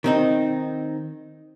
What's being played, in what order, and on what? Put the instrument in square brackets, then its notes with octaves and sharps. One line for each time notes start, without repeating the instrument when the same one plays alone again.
[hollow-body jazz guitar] D#3 C4 D#4